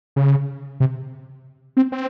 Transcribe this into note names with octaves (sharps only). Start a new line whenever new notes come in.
C#3
C3
C4
C4